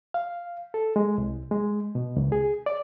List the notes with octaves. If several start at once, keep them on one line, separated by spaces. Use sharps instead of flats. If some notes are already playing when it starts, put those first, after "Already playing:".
F5
A4
G#3
C2
G#3
B2
C#2
G#4
D5